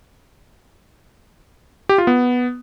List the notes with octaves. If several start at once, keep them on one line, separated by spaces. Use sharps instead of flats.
G4
F4
B3